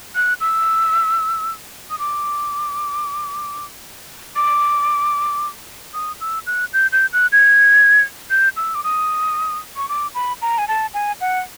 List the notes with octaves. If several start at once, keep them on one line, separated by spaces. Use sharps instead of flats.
F#6
E6
D#6
D6
D6
D#6
E6
F#6
G6
G6
F#6
G#6
G6
E6
D6
D#6
C#6
D6
B5
A#5
G#5
A5
G#5
F#5